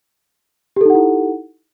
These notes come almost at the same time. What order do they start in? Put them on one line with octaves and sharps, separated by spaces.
G4 A4 D#4 F#5 E4